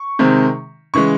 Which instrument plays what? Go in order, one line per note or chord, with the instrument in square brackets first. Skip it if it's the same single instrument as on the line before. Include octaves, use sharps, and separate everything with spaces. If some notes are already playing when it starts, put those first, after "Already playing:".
Already playing: [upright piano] C#6
C3 D#3 G#3 C4
C#3 E3 G#3 C#6